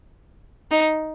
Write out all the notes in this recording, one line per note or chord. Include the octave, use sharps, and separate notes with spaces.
D#4